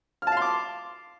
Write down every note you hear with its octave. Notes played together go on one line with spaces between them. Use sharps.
F5 A5 C6 D6 F6